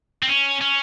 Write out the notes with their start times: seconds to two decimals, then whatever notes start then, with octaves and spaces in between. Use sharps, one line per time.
0.23 C4
0.28 C#4
0.61 C#4